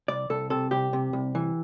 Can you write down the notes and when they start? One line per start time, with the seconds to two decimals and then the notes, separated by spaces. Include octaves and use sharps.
0.08 C2 D5
0.30 C2 A4
0.50 C3 A4
0.71 C2 G4
0.93 C3
1.13 C2
1.35 E3